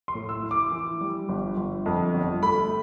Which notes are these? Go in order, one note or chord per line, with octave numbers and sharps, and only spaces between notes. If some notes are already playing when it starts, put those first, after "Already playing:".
C6
A2
E6
E4
D6
E3
G3
G1
G1
F2
G1
A3 B5